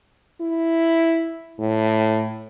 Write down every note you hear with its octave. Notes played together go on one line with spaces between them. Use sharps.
E4
A2